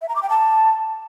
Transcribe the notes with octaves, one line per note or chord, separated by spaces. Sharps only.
E5
A#5
D6
G5
A5